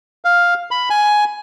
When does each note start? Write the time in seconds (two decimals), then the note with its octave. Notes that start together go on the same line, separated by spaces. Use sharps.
0.25 F5
0.71 B5
0.90 G#5